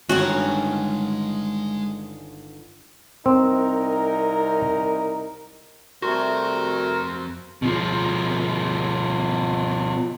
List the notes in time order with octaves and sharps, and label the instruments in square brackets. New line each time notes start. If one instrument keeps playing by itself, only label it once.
[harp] G1 D#3 [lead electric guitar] G#3 G5 [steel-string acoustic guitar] C#4 F4 G#4 [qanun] F#4
[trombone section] C2 D#4 A#4 [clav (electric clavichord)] C4
[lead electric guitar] F2 C5 [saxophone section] C3 G3 A3 [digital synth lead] F#4 [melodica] A#4
[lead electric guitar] B2 F3